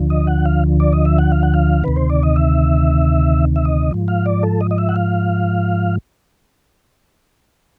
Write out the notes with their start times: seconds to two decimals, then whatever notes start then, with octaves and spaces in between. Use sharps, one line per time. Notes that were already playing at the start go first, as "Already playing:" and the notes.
Already playing: D2 D3 F3
0.10 D#5
0.27 F#5
0.46 F5
0.80 D5
0.93 D#5
1.05 E5
1.18 F#5
1.32 F5
1.43 F#5
1.54 F5
1.84 D2 C3 D#3 B4
1.96 C5
2.10 D5
2.23 D#5
2.36 E5
3.56 E5
3.65 D#5
3.91 G#2 F3
4.08 F5
4.26 D5
4.43 A4
4.61 D#5
4.71 D#5
4.78 E5
4.89 F#5
4.96 F5